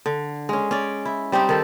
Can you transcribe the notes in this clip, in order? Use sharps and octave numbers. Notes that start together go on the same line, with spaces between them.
D3
G#3 C#4
C#4 D5
E4
G3 C4 D#4 G4
D#3 A4